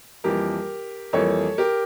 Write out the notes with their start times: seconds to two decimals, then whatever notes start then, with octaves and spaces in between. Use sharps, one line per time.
0.24 F2 E3 G3 A#3 G4 A#4
1.13 F2 E3 G3 A#3 A4 C#5
1.58 G4 A#4